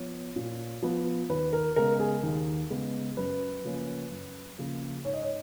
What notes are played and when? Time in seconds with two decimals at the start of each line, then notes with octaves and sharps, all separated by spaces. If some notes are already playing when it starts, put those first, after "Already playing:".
Already playing: F3 B3 C#5
0.36 A#2
0.82 F3 B3
1.29 D#2 B4
1.53 A#4
1.76 C#3 G#3 B3 A#4
2.00 G#4
2.23 D#2
2.70 C#3 G#3 B3
3.17 F#2 B4
3.64 C#3 F3 A#3 C#4
4.11 F#2
4.57 C#3 F3 A#3 C#4
5.04 G#2 C#5
5.13 D#5
5.22 C#5